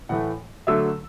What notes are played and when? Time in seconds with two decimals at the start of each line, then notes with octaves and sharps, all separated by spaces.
0.09 A2 E3 A3 F#5
0.67 D3 F#3 A3 E5 E6